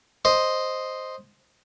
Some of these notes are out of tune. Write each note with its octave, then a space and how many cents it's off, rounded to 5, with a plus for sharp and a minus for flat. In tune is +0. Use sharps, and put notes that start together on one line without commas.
C5 +0 D#5 +0